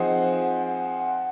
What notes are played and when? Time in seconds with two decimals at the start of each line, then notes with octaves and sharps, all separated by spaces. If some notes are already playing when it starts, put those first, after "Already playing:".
Already playing: F3 C4 D#4 G#4 C5 F#5
0.67 F#5